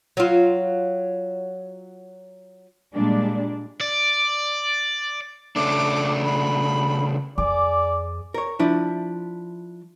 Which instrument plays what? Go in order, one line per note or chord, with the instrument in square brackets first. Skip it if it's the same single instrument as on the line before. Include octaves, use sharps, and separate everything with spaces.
[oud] F#3 F4
[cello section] A#2 G3 G#3 D4
[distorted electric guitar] D5
[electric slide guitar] C#3 A3 D4 [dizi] D6
[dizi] B5
[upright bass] F2 [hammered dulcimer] G#4 D6 [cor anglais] D5
[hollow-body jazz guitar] A#4 C#5
F3 D4 E4